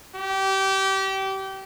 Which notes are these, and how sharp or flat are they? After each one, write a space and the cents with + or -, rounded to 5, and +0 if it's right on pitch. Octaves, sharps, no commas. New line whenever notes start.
G4 -25